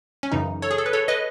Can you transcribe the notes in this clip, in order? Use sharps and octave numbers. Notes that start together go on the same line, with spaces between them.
C#4
F#2 C#3 E3 D#4
A4 C#5
G#4
A4
B4
A4 C#5
B4 D#5